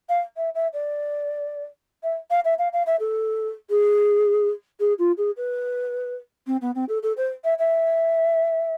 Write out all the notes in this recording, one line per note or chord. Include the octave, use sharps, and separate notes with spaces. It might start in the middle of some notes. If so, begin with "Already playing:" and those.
F5
E5
E5
D5
E5
F5
E5
F5
F5
E5
A4
G#4
G#4
F4
G#4
B4
C4
B3
C4
A4
A4
C5
E5
E5